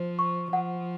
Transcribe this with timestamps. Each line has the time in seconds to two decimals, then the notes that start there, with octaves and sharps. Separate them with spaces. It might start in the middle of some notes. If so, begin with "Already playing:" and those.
Already playing: F3 C5
0.19 C#6
0.53 F3 F#5